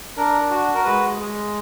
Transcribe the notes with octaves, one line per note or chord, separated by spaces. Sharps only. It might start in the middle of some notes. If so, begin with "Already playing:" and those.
D4 A#4
F#4
A#4
G#3 B4
G#3